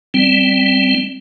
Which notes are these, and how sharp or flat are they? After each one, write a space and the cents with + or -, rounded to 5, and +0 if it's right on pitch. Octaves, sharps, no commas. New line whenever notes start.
G3 +0 C4 +5